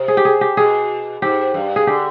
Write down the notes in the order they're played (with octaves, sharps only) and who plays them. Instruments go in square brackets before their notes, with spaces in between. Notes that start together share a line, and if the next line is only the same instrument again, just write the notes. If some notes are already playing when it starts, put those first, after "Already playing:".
Already playing: [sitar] C3
[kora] G#4
G4
G#4
G4
[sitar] B2 [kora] G#4
[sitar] G#2 [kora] G4
[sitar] G2
[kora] G#4
[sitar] D3 [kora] G4